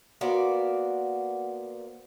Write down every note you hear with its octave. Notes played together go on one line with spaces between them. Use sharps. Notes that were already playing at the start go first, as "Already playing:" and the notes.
A#3 B3 F#4 C5 D5